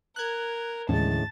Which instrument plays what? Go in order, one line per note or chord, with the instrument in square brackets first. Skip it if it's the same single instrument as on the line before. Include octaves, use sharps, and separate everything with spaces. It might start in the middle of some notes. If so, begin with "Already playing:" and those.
[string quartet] A#4 [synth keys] F#6 G#6
[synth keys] D#2 [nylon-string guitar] A2 G#3 [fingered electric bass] D3 E3 C#4 [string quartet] A5 A6